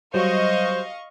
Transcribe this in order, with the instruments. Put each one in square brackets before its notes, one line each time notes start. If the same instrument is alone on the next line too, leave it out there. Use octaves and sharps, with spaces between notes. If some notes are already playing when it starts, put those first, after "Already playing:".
[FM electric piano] F#3 G3 [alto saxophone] C5 [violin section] D#5 F5 C#6